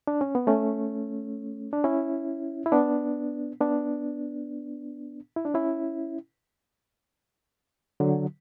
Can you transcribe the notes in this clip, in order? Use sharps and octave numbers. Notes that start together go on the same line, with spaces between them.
D4
C#4
B3
A3 C#4
D4
C#4 E4
E4
B3 D4
B3 D4
E4
D4
C#4 E4
D3 F#3